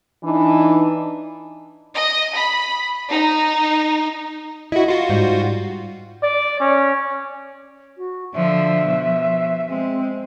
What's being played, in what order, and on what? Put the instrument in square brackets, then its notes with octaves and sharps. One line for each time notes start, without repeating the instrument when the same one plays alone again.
[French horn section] E3 D4 D#4
[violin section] D#5
B5
D#4
[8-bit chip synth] E4 F#4 [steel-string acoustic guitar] D#5
[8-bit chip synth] F4 F#4
[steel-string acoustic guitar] G#2 G3
[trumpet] D5
C#4
[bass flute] F#4
[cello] D3 F3 [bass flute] E5
[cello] B2 F3
[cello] G#3 [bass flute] C4